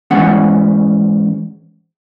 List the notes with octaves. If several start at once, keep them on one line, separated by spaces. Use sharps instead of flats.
G#2 E3 B3 C#4 F#5